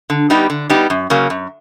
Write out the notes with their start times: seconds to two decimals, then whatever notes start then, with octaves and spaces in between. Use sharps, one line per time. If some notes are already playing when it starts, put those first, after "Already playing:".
0.10 D3
0.30 G3 B3 D#4 G4
0.50 D3
0.70 G3 B3 D#4 G4
0.90 F#2
1.10 C#3 F#3 A#3
1.30 F#2